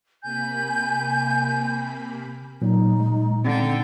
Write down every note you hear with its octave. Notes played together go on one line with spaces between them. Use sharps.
C3 A#3 G#5 B5 G6
A#2 F#3 D#4
G#3
D3 C4 G5